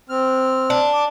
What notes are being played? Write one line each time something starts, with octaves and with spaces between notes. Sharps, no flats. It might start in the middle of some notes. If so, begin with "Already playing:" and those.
C4 F6
D4
D6